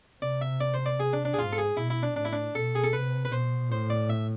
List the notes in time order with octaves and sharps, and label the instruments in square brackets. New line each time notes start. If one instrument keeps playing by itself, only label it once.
[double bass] C3 [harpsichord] D5
[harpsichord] E5
D5
C5
D5
G#4
D4
D4
G#4
[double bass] G#2 [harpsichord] F4
[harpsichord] A4
G#4
[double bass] B2 [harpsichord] E4
[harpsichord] E4
D4
[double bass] A2 [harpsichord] D4
[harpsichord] E4
D4
[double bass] B2 [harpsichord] A4
[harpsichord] G#4
A4
[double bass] C3 [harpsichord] B4
[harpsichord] B4
[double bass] B2 [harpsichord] C5
[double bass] A2 [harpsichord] C5
[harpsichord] D5
E5